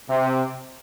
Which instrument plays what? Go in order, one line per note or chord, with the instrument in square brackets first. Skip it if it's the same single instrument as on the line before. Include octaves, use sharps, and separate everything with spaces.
[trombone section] C3